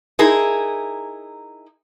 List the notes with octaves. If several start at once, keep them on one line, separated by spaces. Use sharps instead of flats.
D#4 E4 G#4 A#4